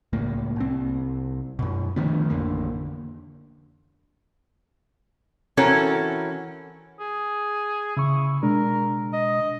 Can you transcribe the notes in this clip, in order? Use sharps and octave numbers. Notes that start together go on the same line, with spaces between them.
C#2 A2 A#3
C2 C4
F#2 B2
D2 D#3 F3 B3
A1 F2 D3 A#3
E3 C4 C#4 F#4 A4 A#4
G#4
C#3 E4 C#6
B2 G#3 D4 A#4
D#5